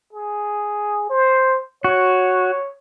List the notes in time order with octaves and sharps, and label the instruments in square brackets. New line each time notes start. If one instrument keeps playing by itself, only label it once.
[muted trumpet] G#4
C5
[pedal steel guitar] F#4 [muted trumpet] C#5